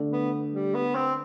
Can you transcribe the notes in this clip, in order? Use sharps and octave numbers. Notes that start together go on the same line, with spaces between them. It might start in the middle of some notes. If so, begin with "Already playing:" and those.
Already playing: D3 A3 D4
B3
G3
B3
C4